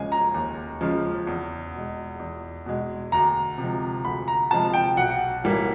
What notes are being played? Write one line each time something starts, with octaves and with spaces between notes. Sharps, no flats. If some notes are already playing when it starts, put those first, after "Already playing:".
Already playing: D#2 C#3 F3 G#3 G#5
A#5
D#2
C#3 F3 G#3
E2
B2 G#3
E2
B2 G#3
D2 A#5
C3 F3 G#3
D2 B5
A#5
C3 F3 G#3 A5
G5
B1 F#5
A2 E3 G3 A#3